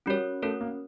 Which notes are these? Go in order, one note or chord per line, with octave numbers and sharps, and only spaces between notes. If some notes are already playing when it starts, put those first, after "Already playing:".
G3 C#4 F#4 A#4 C#5
A3 C#4 F#4 A#4 C#5
A#3